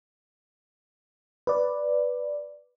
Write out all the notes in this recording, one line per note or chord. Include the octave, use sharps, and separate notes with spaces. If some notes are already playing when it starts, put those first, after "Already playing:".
B4 D5